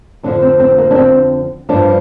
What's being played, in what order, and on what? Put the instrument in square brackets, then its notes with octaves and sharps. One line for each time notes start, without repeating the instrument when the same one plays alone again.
[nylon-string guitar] F2 D3 F3 D4
C4
C4
A#3
D4
C4
G2 F3 D4